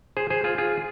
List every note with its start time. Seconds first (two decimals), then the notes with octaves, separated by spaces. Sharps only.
0.17 G#4 C5
0.30 G#4 C5
0.44 F4 G#4
0.58 F4 G#4